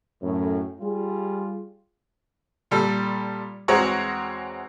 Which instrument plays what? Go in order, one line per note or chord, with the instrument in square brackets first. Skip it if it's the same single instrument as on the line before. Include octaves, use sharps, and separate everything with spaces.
[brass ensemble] F#2 A2
G3 F4 G#4
[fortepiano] A#2 G3 A4
E2 G#3 C4 F#4 C#5 A#5